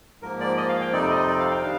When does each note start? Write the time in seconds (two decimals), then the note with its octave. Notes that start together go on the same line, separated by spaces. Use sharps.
0.22 G#2 F3 A#3 A#4
0.40 D5
0.57 D#5
0.69 F5
0.81 G5
0.92 F2 C3 G3 C4 D#4 D5
1.10 D#5
1.28 D5
1.39 F5
1.51 G5
1.62 D#3 G3 D4 F5